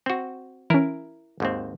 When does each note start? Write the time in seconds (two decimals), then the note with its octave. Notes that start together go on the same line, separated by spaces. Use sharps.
0.06 C4 F#4
0.70 E3 C#4 E4 A#4
1.40 G#1 D#2 C4